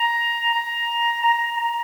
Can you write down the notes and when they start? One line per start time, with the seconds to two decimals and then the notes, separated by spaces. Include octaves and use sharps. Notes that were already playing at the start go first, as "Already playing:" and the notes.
Already playing: A#5
0.53 A#5
1.23 A#5
1.57 A#5